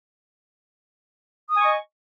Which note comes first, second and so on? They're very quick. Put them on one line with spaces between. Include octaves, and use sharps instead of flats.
D#6 G#5 C#6 D#5